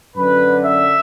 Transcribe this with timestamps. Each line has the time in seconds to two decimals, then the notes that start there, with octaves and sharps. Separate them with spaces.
0.16 F#2 D3 B4
0.64 E5